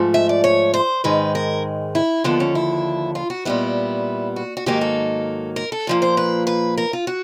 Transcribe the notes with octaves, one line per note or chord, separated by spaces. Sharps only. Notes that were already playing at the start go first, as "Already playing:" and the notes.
Already playing: G#2 F3 A3
E5
D5
C#5
C5
G#2 D#3 G#3 B4
A#4
E4
D#2 D3 F3 B3
C#4
E4
F4
F#4
A#2 G3 B3 E4
F#4
F#4
G#2 D#3 F#3 A#3 G4
A4
A#4
A4
A#2 F3 A#3
C5
B4
B4
A#4
F4
F#4